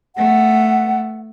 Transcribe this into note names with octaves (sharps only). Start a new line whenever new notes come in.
A3 B3 F#5